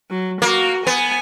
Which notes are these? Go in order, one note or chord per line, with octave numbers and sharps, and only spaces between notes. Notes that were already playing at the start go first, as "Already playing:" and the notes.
F#3
A#3 F#4
B3 G#5